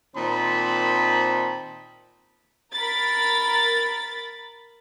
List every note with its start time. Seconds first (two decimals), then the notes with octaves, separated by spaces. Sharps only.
0.16 A#2 D#3 C4 D#4 A5 B5
2.75 A#4 B5 A6